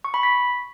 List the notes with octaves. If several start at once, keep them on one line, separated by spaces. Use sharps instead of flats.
C#6
B5
B6